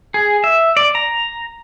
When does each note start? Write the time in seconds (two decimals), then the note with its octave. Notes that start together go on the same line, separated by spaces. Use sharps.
0.14 G#4
0.44 E5
0.77 D5
0.95 A#5